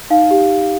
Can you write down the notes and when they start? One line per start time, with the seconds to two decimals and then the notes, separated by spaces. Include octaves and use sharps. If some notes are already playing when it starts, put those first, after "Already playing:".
0.10 D#4 F5
0.31 G4